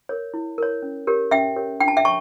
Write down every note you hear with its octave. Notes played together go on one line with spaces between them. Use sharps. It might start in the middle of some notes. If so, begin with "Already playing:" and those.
A#4 C#5
E4
A#4 C#5
C#4
G4 A#4 C#5
C#4 E5 G5
G4 A#4 C#5
D4 G5
A5
E5 G5
C#5 A5 C#6